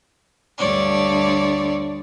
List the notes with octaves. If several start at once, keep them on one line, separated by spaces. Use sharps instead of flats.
D2 G2 C#5 D5